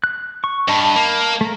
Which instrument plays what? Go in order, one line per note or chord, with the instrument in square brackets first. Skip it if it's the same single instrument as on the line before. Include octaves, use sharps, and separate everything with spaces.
[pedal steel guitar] F#6
C#6
[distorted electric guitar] G2 [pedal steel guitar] D#5 A5 B5
[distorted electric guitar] A#3
[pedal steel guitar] A3 A#4